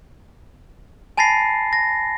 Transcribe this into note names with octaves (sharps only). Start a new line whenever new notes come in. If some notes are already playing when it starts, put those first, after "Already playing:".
G#5 A5 B5 A6 A#6 C7
A#6